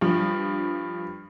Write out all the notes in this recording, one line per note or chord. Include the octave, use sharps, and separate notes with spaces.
G2 F3